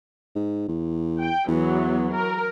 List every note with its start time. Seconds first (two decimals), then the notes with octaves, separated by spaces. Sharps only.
0.36 G#2
0.69 E2
1.19 G5
1.48 E2 E3 F#3 B3
2.13 A#4